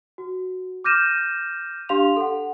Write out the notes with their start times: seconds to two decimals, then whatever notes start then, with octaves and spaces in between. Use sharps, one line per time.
0.18 F#4
0.84 D6 F6 G6 A#6 D#7 E7
1.89 D4 G4 F5 C6 F7
2.16 A4 F#5